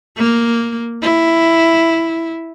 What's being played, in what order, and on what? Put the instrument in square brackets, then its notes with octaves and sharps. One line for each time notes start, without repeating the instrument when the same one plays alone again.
[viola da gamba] A#3
E4